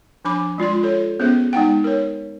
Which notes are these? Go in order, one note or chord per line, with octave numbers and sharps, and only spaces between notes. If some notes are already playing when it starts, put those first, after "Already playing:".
F3 D4 B5 D6
G#3 F4 D5 C6
F4 A4 C#5
B3 C#4 G#4 C5 E5
G#3 D#4 F#5 G5
A#4 C#5